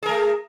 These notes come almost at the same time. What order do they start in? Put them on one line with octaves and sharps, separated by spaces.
G#4 A#4 A3